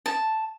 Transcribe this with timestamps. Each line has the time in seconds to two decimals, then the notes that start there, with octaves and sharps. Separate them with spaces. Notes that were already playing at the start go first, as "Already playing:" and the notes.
0.06 A5